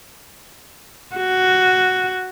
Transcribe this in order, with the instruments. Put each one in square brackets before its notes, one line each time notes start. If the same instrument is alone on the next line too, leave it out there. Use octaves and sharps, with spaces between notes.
[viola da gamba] F#4